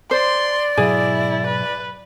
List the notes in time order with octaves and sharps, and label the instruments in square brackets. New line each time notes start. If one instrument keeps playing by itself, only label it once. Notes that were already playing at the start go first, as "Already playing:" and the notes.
[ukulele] C5 [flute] D5 [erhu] C6
[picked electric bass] G#2 B2 F#3 [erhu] E4 [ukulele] G#4
[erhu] B4